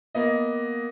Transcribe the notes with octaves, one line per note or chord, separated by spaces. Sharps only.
A#3 B3 D#5